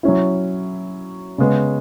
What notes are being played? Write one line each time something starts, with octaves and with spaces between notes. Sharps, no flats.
F#3 C#4 E4
C#3 G#3 B3